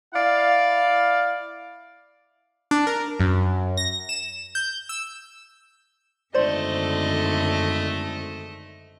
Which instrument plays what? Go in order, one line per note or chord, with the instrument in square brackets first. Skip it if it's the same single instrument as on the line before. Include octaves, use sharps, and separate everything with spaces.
[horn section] E4 D5 F5
[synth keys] D4
A#4
F#2
A#6
E7
G6
E6
[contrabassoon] G#1 [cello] F#2 D3 [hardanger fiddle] A3 D#5 [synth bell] C5 D5 C6